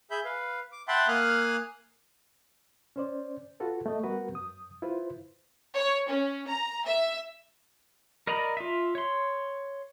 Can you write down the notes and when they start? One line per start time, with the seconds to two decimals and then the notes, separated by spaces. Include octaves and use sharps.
0.11 G#4 E5 B5 G6
0.25 B4 F5
0.72 D6
0.88 E5 F#5 G5 A5 B5 C6
1.08 A#3 F5 G#5 D#6 F6 F#6
2.96 C#4 C5 D5
3.60 F4 F#4 A4 B4
3.86 A3 D#5
4.03 G3 B3 F#4 A#4 B4
4.32 F#2 D#6
4.82 E4 F4 B4 C5
5.75 C#5
6.09 C#4
6.47 A#5
6.86 E5
8.27 A#4 D5 D#5 A#5 B5
8.57 F4 E5
8.95 C#5 C6